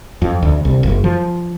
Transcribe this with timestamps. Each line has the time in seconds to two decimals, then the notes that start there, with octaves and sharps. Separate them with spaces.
0.22 F2
0.43 D2
0.65 C2
0.83 F#1
1.04 F3